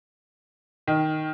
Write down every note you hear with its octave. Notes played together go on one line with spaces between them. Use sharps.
D#3